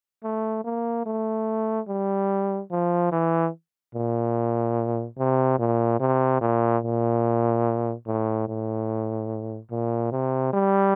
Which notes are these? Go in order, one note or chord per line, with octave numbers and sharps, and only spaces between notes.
A3
A#3
A3
G3
F3
E3
A#2
C3
A#2
C3
A#2
A#2
A2
A2
A#2
C3
G3